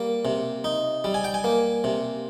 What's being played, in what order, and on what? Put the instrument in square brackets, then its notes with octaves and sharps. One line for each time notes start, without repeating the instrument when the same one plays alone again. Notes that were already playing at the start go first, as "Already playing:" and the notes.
Already playing: [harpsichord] G3 A#3
C3
D#4
G3
G#5
G5
G#5
A#3
C3